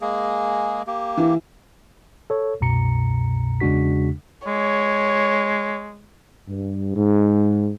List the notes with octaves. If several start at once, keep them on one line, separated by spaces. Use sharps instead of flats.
G#3 A#3 G#4
A#3 G4
E3
A4 C#5
C2 F#2 B2 A#5 C#7
E2 C#3 G#3 D4 F#4 B6
G#3 C#5
G2
G#2